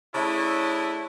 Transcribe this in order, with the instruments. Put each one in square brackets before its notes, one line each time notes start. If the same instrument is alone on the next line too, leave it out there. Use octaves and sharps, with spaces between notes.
[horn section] C#3 A3 D4 E4